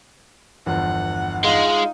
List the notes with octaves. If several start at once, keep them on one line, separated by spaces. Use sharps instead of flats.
G1 E2 F3 F#5
G#3 D#4 F4